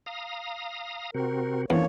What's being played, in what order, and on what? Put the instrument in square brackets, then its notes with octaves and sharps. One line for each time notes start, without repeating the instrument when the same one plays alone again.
[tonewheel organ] F5 A#5 D#6
[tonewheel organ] C3 C4 F#4 [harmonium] A#4
[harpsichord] E2 [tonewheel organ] F3 C#4 D4 [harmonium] A#3 C#5